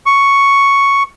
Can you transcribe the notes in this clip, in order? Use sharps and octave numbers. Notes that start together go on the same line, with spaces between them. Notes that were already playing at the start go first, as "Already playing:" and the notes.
C#6